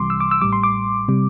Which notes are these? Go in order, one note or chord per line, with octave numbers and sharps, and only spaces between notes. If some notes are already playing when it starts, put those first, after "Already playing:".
Already playing: C2 C3 E3 G3 C6 D6
E6
D6
E6
A1 A2 G3 D6
C6
D6
C3 G3